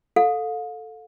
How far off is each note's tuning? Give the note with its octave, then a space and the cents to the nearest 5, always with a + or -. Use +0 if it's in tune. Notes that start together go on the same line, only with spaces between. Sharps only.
A4 +0 F5 +35